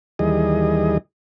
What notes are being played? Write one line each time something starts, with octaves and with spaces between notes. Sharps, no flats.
D#2 E3 G3 G#4 D#5